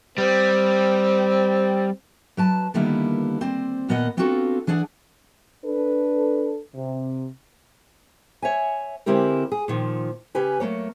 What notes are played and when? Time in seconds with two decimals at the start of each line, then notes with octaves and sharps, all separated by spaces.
0.18 G3 C4
2.37 F#3 B4 A5
2.74 D3 D#3 G3 A#3 B3 E4
3.41 C4 C5 D5
3.88 D#2 A#2 B3 A#4 D#5 F#5
4.17 B3 C4 D4 F4 F#4 A4
4.67 E3 D4 G#4 D5 F#5
5.64 D4 A4 B4
6.75 C3
8.42 C#5 E5 G#5
9.06 D3 G#3 C4 E4 G4 A#4
9.52 G#4
9.68 A#2 D#3 F3
10.35 C#3 C#4 G4 B4 G#5
10.60 F#3 A3 A#3 C#5